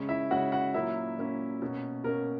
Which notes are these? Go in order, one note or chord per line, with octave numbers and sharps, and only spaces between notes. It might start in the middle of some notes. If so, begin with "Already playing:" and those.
Already playing: C#3 G#3 C#4
E4 E5
C#3 G#3 C#4 F#4 F#5
F#4 F#5
A#2 F#3 A#3 C#4 E4 E5
A#2 F#3 A#3 C#4
B2 A#3 C#4
B2 A#3 C#4 A#4